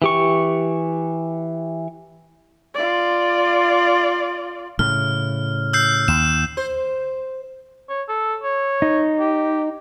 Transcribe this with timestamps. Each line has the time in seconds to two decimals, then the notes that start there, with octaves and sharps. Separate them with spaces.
0.02 E3 G4 C#6
2.74 F4 D5
4.79 A2 C#3 F6
5.73 E6 G6 C7
6.08 D#2 E7
6.57 C5
7.89 C#5
8.08 A4
8.43 C#5
8.82 D#4
9.19 G4